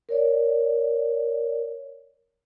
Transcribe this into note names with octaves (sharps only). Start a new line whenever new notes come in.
A#4 C#5 D5